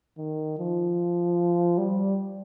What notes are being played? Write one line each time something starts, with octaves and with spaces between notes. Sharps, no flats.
D#3
F3
G3